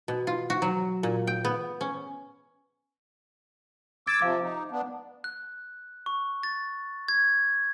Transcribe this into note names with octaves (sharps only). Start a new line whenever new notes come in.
B2
F4
F#4
F#3
A#2
G5
B3
C#4
D6 E6 G#6 A6 D7
C3 F3 F5 D6
D#4
B3 D4
F#6
C#6
A6
G#6